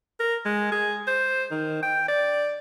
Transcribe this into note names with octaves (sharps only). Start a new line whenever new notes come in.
A#4
G#3
G#4
C5
D#3
G5
D5